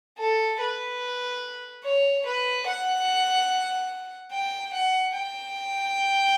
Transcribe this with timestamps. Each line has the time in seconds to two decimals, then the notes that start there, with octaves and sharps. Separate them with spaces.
0.18 A4
0.60 B4
1.84 C#5
2.26 B4
2.67 F#5
4.32 G5
4.74 F#5
5.15 G5